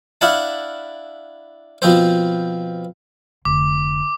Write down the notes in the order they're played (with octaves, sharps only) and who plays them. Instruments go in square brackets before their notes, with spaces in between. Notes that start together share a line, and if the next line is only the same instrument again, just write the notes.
[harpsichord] D4 E4 F5 F#5 A5
B2 F3 C4 C5
[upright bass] F1 D3 [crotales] D6